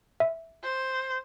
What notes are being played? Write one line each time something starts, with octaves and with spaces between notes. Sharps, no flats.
E5
C5